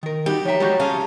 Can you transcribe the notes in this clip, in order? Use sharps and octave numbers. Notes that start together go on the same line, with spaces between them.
D#3 A#4
G3 D#4 F#4 G4
F3 C#5 E5 G5 A#5
G3 G#3 F#4 A#5 C#6 G6
C#4 F4 G#4 A5